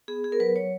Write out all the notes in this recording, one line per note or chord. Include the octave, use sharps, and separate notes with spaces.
B3 G#4
G#4
A#4
F#3 B4
C#5